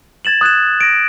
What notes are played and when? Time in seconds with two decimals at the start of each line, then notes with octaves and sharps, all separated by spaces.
0.25 G#6 A6 E7 F#7
0.41 D#6 F#6 G#6 E7
0.81 A#6 D7